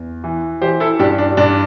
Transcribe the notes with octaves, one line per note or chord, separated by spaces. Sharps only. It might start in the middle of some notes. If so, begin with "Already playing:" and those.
Already playing: E2
E3
E3 G4 C5
E4 A4
G2 D4 G4
D4
G2 D4